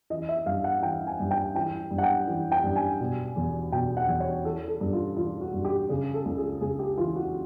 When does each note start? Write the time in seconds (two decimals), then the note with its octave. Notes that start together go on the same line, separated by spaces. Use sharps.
0.10 E3 D#5
0.29 E5
0.46 G2 F5
0.64 F#5
0.82 E3 G5
1.07 G#5
1.20 G2
1.31 G5
1.55 E3 G5
1.91 G2
1.98 F#5
2.03 G5
2.27 E3
2.52 G5
2.63 G2
2.76 G#5
3.00 B2
3.36 E2
3.72 B2 G5
3.97 F#5
4.08 E2
4.20 C#5
4.44 E3 A4
4.68 A4
4.80 G2
4.93 F4
5.17 E3 F4
5.41 F#4
5.53 G2
5.65 G4
5.89 C#3 G#4
6.14 A4
6.25 C#2
6.38 G#4
6.61 C#2 G#4
6.79 G4
6.97 E3 F4
7.16 F#4